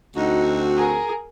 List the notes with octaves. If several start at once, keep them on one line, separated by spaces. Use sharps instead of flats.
D2 C4 D#4 F#4
G#4 A#4